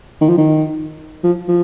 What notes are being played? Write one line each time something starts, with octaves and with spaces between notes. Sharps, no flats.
D#3
F3
D#3
F3
F3